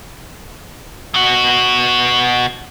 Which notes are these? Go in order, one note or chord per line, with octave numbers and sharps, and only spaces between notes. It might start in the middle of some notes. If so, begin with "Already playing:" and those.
B2 F#4